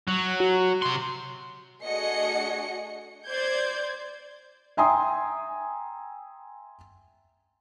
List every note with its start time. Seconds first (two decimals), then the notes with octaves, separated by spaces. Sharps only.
0.08 F#3
0.40 F#4
0.82 C3 C6
1.83 A3 D4 F#4 G#4 D#5 C#7
3.27 C5 D5 G6 G#6
4.77 E5 G5 G#5 A#5 C6 D#6